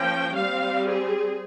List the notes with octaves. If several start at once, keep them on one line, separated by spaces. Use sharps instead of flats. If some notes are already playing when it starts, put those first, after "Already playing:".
Already playing: F3 A#3 C#4 G5
G3 C4 F5
G#4